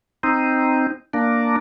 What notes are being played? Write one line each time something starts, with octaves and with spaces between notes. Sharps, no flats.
C4 D#4
A#3 D4